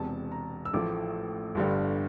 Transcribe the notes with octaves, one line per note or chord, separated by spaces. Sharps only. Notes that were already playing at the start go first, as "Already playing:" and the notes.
Already playing: E1 E2 C3 A5
A#5
E6
A1 A2 F3 A3 D6
G1 G2 D3 G3